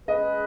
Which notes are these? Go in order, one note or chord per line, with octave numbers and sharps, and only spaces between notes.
G#3 C#4 G#4 B4 D#5